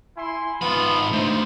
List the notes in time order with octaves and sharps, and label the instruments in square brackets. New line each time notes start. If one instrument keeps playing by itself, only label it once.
[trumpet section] E4 G#5 C6
[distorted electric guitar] G#2 B5 [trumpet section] B3 F4
[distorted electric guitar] D3 A3 [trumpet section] D#4 C5